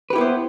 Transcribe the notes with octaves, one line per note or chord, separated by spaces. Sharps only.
B3 E4 G4 B4 C5